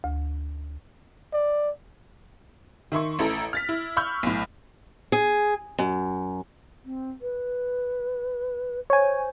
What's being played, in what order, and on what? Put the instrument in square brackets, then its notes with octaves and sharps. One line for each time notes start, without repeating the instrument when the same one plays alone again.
[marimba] D2
[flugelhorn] D5
[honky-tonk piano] D#3 E5 C6 C#6
A1 E4 A4 A#5
F6 A6 B6
E4
B5 C#6 E6 F6 G6
B1 A2
[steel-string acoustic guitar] G#4
F#2
[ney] C4
B4
[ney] C5 [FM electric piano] C#5 G#5